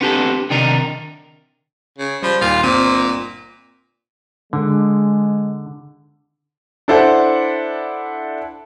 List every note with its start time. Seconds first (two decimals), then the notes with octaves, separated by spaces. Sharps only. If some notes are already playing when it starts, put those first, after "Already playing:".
0.01 B3 C4 D4 G4 A4
0.50 C3 D#3 D4 D#4 A#4
1.98 C#3
2.22 F3 G3 B5
2.41 D#2 A#2 F4
2.63 G1 A#2 C4 D#7
4.53 D3 G#3
6.88 D4 E4 A4 C5 D5 F#5